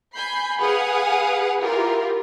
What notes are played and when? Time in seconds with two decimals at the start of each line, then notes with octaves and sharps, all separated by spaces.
0.14 G#5 B5 G6 C7
0.60 G#4 B4 F5 F#5 G#5 D#6
1.60 E4 F4 G4 A#4